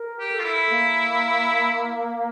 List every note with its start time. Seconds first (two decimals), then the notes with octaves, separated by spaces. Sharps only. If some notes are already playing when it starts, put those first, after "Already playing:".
Already playing: A#4
0.19 G4
0.32 A4
0.39 F4
0.44 E4
0.70 A#3